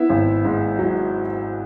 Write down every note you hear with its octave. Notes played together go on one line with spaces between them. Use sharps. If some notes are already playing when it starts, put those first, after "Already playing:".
Already playing: B3 E4 E5
G#1
G#2
F#3